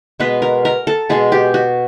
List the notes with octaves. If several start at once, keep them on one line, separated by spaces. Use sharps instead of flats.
B2 G#3 B3 B4
A#4
A#4
A4
B2 G#3 B3 G#4
G4
F#4